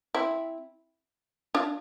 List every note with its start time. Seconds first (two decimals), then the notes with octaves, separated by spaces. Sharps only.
0.15 C4 E4
1.55 D4 F4